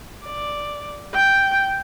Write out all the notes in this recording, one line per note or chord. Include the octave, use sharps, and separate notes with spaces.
D5
G5